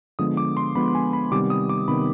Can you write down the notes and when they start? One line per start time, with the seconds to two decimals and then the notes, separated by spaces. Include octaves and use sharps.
0.19 D3 F3 G#3 B3 D#6
0.37 D6
0.57 C6
0.75 D3 F3 G#3 B3 B5
0.95 G#5
1.13 B5
1.31 C3 D#3 G3 B3 D6
1.50 D#6
1.69 D6
1.88 C3 D#3 G3 B3 B5